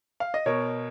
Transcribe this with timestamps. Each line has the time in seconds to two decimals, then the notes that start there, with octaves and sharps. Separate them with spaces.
0.20 F5
0.34 D#5
0.46 B2 A#4 C#5